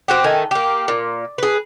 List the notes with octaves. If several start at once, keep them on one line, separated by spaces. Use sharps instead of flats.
C4 F#4 G4
D#3 A3 G#5
A#3 G4
A#2
G#4 B4